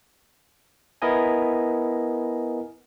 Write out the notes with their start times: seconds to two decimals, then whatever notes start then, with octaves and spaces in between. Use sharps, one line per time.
1.02 B3 E4 A#4 D#5 G#5